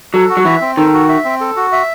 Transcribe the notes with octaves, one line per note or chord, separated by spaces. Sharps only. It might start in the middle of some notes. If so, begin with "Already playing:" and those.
F#3 A4
F#4
F#3
E3 E5
C4
D#3 A4
F#4
E5
C4
A4
F#4
E5